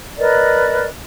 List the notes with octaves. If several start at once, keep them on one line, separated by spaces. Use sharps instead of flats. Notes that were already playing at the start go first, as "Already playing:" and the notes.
A#4 B4 D5 D#5